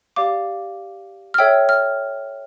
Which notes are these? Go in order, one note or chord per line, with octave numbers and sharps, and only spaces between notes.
G4 D5 F5 D6
F6
A4 C#5 E5 G5 E6
F6